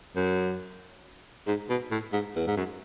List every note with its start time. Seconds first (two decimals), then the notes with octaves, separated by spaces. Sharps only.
0.16 F#2
1.47 G#2
1.69 B2
1.91 A2
2.13 G#2
2.36 E2
2.47 G#2
2.56 F#2